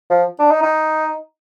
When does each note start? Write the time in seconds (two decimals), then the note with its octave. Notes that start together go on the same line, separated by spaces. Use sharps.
0.10 F3
0.39 D4
0.51 D#4
0.63 D#4